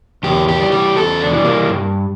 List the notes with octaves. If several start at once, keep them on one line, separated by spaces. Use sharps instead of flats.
E2 G4
G4
E3 G3
G4
E2 A4
D4
E3 G3
A#3
G2